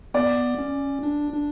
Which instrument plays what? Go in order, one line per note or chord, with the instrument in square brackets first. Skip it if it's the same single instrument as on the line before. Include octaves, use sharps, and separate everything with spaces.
[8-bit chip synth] B3 [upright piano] D5
[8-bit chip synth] C#4
D4
D4